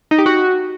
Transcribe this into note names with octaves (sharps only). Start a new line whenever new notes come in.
D#4
G4
F#4